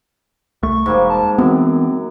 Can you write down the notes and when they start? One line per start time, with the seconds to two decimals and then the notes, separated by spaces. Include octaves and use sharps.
0.63 C2 A3 C#6
0.86 E1 G#2 G3 A#3
1.10 A5
1.38 F#2 E3 B3 C4